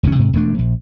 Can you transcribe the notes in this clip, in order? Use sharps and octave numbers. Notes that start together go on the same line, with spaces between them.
E1 C#2 A#2 C#4
G#2 C3
E1 F2 A3 D4
A#1